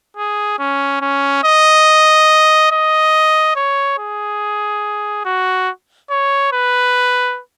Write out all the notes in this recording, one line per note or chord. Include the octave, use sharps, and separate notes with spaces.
G#4
C#4
C#4
D#5
D#5
C#5
G#4
F#4
C#5
B4